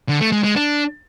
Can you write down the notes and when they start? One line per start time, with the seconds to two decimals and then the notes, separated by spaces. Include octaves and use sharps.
0.09 D3
0.21 A3
0.32 G#3
0.44 G#3
0.56 D4